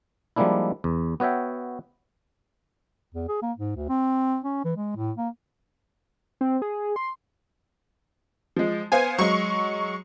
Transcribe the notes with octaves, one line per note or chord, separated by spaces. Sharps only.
F3 G3 G#3 A#3 D4 E4
E2
B3 F#4 C#5 E5 G5
E2
G#4
A#3
G#2
D2
C4
C#4
E3
G#3
A2
A#3
C4
G#4
C6
F3 G#3
B3 C5 F5 G#5
F#3 G#3 C#6